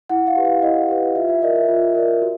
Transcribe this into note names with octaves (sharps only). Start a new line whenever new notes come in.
E4 F#5
F5
G4 B4
F5
E4 D#5
G4 B4
F4 E5
E5
A#4 D5 D#5
E5
F4
A#4 D5
F#4